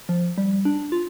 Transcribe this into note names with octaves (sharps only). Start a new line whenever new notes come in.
F3
G3
D4
F4